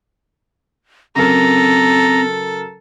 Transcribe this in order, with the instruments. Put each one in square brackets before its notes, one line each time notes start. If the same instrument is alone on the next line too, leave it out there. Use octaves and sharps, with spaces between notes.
[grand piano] C#3 F#3 A#4 [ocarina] C4 [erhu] A4 [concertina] A#5